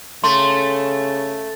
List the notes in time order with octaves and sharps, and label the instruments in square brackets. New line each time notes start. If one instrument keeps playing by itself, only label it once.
[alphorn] C#3 [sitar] A3 [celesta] C6